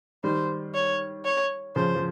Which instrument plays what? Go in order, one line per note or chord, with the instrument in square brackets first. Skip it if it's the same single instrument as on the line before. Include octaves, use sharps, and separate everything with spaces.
[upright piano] D#3 G3 [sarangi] C5
[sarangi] C#5
C#5
[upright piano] C#3 F3 [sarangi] C5
[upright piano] F3